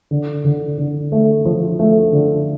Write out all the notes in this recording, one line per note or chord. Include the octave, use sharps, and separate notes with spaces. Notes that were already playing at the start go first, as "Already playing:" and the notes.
D3
D3
D3
A3
F3
A3
D3